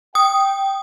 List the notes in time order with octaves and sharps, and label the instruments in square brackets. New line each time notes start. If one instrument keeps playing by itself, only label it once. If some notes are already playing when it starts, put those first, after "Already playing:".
[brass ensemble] G5 [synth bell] D#6